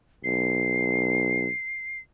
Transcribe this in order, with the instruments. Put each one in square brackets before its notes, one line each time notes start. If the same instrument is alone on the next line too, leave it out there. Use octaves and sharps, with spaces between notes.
[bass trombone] B1 [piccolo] C7